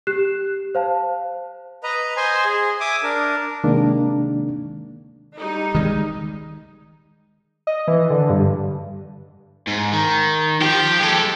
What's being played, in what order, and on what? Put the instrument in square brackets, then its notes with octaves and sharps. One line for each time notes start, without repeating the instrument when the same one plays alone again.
[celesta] G4 F#6 C7 E7
C5 F5 A5
[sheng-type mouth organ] B4 D#5 A#5
C5 D#5 G#5 C6
G#4
E5 G#5 D6 D#6
D4 A#4
[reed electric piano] C3 D#3 G#3 A#3 D4
[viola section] G3 D#4
[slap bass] D#3 G#3
[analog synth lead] D#5
E3
D3
G2
[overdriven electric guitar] G#2
D#3
[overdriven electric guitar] F3 [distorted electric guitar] G4
[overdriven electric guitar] G#3 A4